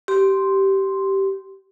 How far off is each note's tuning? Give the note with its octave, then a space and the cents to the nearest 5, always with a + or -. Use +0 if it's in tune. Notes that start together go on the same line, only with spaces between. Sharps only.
G4 -15 C6 +0